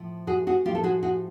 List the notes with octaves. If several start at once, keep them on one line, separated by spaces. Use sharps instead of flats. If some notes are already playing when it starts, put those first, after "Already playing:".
Already playing: A2 F3
F#4 G#4
F#4 G#4
A2 F3 F4 G4
A4
F#4 G#4
F#4 G#4